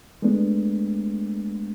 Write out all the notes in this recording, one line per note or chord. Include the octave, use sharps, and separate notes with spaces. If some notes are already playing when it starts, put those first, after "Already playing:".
G#3 A3 B3 D4